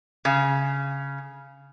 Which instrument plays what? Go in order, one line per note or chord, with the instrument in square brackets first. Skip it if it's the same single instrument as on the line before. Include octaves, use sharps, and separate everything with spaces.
[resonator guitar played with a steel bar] C#3